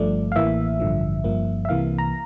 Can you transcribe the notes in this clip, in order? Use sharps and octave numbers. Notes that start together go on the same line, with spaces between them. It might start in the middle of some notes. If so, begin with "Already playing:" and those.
Already playing: G1 G2 F3 A3 D5
F5
A1 A2 E3 A#3 E5
A1 G2 D3 F3
G1 G2 F3 A#3
E5
C2 C3 E3 A#3 F5
A#5